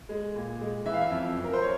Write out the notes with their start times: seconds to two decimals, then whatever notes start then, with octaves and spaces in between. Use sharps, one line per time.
0.09 G#3
0.36 A#2
0.61 G#3
0.86 E3 E5
0.94 F5
1.01 E5
1.11 F2
1.37 F2
1.44 A#4
1.54 C5
1.62 C#5